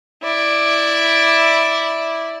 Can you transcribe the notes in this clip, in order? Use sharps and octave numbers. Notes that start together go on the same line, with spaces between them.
E4 D5